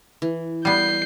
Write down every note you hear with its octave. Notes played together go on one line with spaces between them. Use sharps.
E3
G3 B3 G6 C7